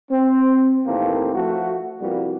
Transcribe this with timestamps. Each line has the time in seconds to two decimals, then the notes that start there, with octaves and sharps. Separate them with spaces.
0.11 C4
0.87 D#2 A2 E3 A3 A#3 C4
1.34 F3 A3 F#4
2.01 C2 F3 G3 A#3 B3 F#4